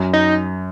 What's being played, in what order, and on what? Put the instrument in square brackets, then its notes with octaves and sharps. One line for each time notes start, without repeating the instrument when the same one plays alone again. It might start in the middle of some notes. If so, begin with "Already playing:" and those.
Already playing: [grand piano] F#2
[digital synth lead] D#4